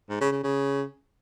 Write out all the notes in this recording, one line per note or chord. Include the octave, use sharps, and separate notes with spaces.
G#2
C#3
C#3
C#3